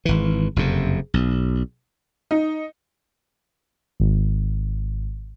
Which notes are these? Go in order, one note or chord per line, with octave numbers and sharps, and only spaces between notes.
G#1 E3
F#1 F2 C3
B1
D#4
G#1